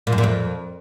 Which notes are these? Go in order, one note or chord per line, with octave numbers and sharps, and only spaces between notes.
A#2
F#2
A#2
F2